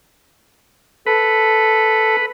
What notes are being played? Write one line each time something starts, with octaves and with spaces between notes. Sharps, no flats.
A4 B4